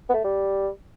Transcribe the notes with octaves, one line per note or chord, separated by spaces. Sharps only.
B3
A3
G3